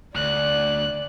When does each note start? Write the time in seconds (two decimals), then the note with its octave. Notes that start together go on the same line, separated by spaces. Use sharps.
0.16 D2 D5 F#6